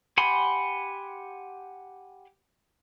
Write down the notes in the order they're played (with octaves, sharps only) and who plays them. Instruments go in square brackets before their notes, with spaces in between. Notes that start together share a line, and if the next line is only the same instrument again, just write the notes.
[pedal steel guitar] G4 F#5 G#5 B5 C6